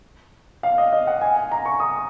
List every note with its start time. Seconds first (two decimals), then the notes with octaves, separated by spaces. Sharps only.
0.63 F5
0.78 D#5
0.93 D#5
1.07 F#5
1.21 G#5
1.36 G#5
1.52 A#5
1.65 C#6
1.80 D#6